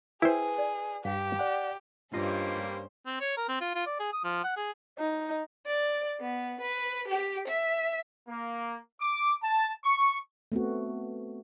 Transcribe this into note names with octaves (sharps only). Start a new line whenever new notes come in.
E4 G#4 B4 C5 G5
D5
G2 G4 F5 G#5
D5 F#5
G2 G3 A#3 C#4 F4 C5 D#5
C4
C#5
A#4
C4
F4
F4
D5
G#4
D#6
F3
F#5
G#4
D#4
D5
B3
B4
G4
E5
A#3
D6
A5
C#6
A3 B3 C4 F#4